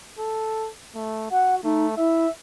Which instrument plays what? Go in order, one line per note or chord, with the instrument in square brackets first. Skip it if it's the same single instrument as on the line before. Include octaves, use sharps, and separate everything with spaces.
[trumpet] A4
A3
[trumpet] F#4 [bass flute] F#5
[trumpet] A3 [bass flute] D#4
[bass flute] E4 [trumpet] E5